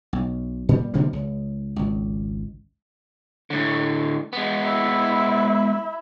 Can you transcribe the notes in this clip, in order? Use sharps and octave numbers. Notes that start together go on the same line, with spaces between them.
B1
A#2 G3
B2 D3 G3 A#3
C#2
G#1 C#2
A2 D3
G#3 B3
E4